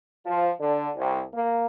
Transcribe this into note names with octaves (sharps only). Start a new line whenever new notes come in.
F3
D3
C2
A#3